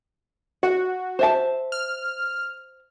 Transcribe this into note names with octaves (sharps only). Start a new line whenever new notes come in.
F#4 F#5
C5 E5 A5
F6